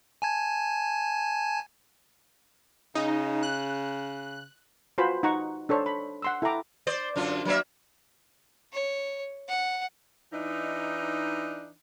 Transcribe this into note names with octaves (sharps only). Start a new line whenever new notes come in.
G#5 A5 G#6
C#3 D#4
F#6
F4 F#4 B4 C5 G#5 B5
D#4 F#5 A#5 C#6
D4 A4 C5 C#5
B5
F#5 C6 E6
E4 A4 E5 G5 A#5 D6
C5 D5
F#2 D3 F4
F#3 A#3 E5
C#5
F#5
E3 D4 D#4